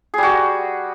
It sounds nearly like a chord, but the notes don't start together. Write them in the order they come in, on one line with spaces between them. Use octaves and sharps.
G#4 G3 F#4